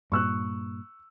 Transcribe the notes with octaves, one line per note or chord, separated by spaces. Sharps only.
G2 A#2 C#6 E6 F#6